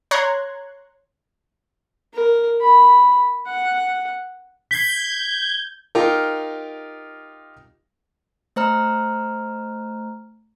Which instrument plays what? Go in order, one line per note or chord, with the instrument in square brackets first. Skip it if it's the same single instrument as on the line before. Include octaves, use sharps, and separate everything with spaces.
[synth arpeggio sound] C#5 A#5 C6 F#6 G#6
[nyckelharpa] A#4
B5
F#5
[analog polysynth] G6 G#6 [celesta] B6 C7
[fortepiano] D#4 F4 G4 A#4
[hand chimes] A3 C5 A#5 F6